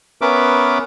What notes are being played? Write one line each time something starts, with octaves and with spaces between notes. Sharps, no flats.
B3 C#4 A#4 B4 E5 D6